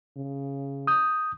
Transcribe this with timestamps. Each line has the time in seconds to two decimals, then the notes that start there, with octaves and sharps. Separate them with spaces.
0.17 C#3
0.87 D#6 G6